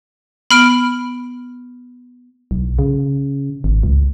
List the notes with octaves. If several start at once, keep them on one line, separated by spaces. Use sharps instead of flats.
B3 B5 F6 D7
B1
C#3
G#1
C#2